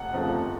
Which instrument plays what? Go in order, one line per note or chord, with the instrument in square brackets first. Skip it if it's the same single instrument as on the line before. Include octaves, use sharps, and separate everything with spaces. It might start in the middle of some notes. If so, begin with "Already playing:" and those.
Already playing: [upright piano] F1 F#5
F2 C#3 F3 A3
G1